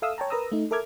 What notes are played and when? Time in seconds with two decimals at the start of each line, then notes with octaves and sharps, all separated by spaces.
0.02 A4 E5 F5 D#6 E6
0.18 C#5 G5 A5 A#5
0.30 A#4 B4 A#5 D#6 E6
0.52 A3 D#4
0.71 A4 A#4 E5 D6 F6 G#6